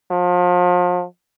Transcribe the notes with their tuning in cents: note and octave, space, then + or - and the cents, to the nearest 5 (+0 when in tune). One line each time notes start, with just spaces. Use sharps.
F3 +35